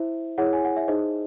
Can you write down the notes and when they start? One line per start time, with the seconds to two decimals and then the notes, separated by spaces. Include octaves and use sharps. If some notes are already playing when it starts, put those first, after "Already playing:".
Already playing: E4 C5 E5
0.38 E4 G#4 C#5 F#5
0.53 G#5
0.65 F#5
0.76 E5
0.88 D#4 G#4 C5 D#5